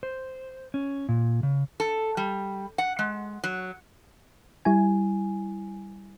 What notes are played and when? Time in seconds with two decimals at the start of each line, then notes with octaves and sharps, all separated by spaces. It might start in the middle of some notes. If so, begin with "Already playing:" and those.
0.03 C5
0.74 C#4
1.09 A#2
1.43 C#3
1.80 A4
2.17 G3
2.78 F#5
2.99 G#3
3.44 F#3
4.65 G3 E4 G#5